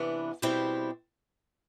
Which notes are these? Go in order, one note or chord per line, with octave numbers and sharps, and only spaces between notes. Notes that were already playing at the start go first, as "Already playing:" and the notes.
Already playing: C3 E3 B3 D4
B2 G3 C4 E4 G4